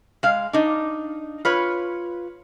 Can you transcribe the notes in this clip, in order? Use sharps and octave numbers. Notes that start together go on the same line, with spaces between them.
G#3 F5
D4 D#4
F4 B4 C#5